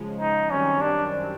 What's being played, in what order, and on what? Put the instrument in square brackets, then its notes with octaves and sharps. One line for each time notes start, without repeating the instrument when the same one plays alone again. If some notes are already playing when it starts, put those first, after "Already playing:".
Already playing: [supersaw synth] C#3 F3 G#3
[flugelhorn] D#4
[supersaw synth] F#2 D#3 G3 C4 [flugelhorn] C#4
[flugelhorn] D4